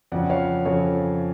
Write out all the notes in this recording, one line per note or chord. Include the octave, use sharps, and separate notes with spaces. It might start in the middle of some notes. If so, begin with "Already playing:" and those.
F2 C#3 F3 D5 F#5
C#5 F5
F2 C#3 F3 A4 C#5